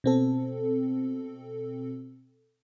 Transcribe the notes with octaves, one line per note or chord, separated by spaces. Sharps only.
B2 C4 A4